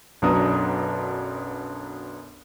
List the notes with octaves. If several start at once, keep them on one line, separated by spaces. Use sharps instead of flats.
B1 F#2 B3 D4 A#5 D#6